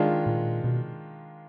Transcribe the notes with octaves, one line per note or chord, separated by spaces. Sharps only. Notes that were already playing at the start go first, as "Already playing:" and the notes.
Already playing: D#3 G#3 D4 F4
A#2
B2